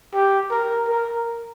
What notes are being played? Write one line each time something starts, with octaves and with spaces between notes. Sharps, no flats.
G4
A#4
A#4